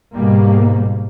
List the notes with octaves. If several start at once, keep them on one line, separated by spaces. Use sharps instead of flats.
G#2 B2 G3 A#3